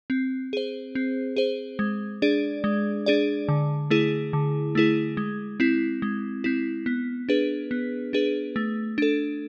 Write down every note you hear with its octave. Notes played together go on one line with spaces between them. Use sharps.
C4
G#4 C5
C4
G#4 C5
G#3
D4 G#4 D5
G#3
D4 G#4 D5
D3
A3 E4 G#4
D3
A3 E4 G#4
G#3
C4 E4
G#3
C4 E4
B3
D4 G#4 B4
B3
D4 G#4 B4
A3
D4 A4